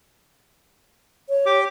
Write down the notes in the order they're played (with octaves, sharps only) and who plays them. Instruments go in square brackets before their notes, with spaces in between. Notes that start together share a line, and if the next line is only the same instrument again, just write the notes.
[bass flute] C#5
[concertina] G4 D6